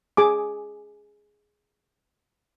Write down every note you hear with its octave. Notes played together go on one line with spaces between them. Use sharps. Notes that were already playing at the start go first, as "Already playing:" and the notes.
G#4 G#5 D6